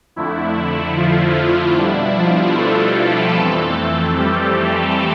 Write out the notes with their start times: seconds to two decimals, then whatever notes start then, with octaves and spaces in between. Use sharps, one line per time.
0.16 F2 D3 A3 E4
0.57 E4
0.97 F3 F4
1.37 F3 F4
1.77 B2 G3 D4 E4
2.17 F3 F4
2.57 A3 A4
3.37 F2 E3 A3 C4
4.18 G3 G4
4.58 A3 A4